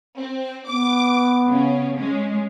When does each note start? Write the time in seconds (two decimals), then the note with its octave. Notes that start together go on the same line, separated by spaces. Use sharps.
0.17 C4
0.68 B3 D6
1.48 C#3 C#4
1.97 G#3 C#4